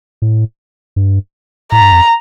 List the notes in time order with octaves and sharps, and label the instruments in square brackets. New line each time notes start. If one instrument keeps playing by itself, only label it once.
[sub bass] A2
G2
[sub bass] A2 [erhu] A#5
[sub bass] G2
F2